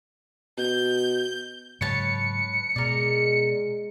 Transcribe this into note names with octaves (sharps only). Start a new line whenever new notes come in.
B2 G6
G#2 C#3 F#3 B4 C#5 A5 C#7
B2 G#3 A#4 D5